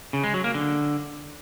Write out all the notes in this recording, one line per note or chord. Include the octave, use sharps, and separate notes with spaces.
C#3
G#3
F#3
A#3
D3